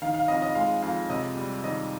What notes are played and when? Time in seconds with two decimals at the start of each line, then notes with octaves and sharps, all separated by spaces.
0.02 D#3 F5
0.14 F5
0.28 F2 D#5
0.42 D#5
0.55 G#3 F5
0.82 F2 F5
1.10 C3 D#5
1.37 G3
1.64 D#3 D#5